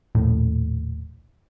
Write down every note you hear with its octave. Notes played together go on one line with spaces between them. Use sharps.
D#1 A#1 A2